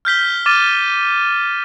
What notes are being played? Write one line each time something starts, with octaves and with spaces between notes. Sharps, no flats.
F6 G6 B6 G7
D6 F6 A6 D#7